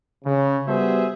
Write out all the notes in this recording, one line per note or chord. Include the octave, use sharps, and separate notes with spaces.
C#3
G3 B3 F#4 G#4 C5 E5